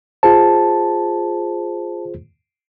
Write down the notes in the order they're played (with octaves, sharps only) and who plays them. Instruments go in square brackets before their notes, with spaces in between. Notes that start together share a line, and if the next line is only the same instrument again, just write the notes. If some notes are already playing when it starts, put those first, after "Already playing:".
[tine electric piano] F4 G#4 C5 [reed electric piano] A5